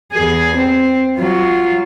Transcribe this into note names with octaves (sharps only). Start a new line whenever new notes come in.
E2 G#4
C4
F#3 F4